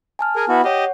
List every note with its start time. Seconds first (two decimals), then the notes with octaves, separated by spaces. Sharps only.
0.19 G#5 A5 F6
0.36 G#4 A#4
0.49 B3 E4 F#4
0.64 G4 C#5 D#5 F#5